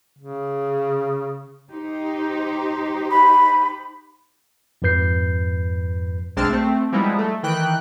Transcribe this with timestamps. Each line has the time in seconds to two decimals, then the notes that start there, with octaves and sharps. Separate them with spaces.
0.19 C#3
1.72 D#4 G4 C5
3.11 B5
4.82 F2 G#2 F3 B4 G6 C7
6.36 B1 G#3 C4 D4 A5 F6
6.49 A3 C4
6.92 F3 G3 G#3 B3 D#4 E4
7.18 A3
7.43 D#3 E3 G5 F#6